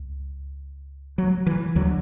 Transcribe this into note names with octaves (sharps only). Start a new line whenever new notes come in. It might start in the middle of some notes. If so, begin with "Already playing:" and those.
Already playing: C#2
F#3
E3
D2 D3 F#3